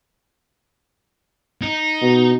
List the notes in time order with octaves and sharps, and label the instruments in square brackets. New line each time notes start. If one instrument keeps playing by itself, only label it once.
[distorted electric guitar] D#4
[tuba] B2